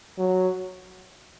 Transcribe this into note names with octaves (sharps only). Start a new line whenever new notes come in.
F#3